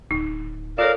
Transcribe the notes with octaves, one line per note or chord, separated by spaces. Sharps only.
D1 D#4
F4 A4 A#4 C#5 D5 F5